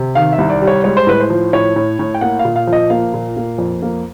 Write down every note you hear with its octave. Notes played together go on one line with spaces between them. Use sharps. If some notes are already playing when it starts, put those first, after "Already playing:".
Already playing: C3
D#3 F5
E5
C2
D5
G3
C#5
G#3 C#5
C5
A2 B4
C5
F3
A2 C#5
A2
A2
G5
A#3 F#5
F5
A#2
F5
F3
D#5
A#3 F5
A#2
A#3
F2
A#3